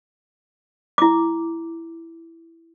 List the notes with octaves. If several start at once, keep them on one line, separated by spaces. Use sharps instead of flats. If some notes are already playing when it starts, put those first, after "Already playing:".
E4 D6